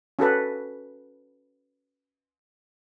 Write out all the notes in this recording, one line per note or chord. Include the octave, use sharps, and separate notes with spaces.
C#4 F#4 A4 B4